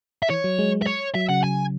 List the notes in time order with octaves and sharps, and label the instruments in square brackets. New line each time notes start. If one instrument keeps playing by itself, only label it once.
[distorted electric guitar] E5
[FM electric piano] E3 [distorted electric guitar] C#5
[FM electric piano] F#3
G#3
[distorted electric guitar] E5
C#5
[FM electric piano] F#3 [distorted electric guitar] E5
[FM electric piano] C#3 [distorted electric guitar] F#5
[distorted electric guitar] G#5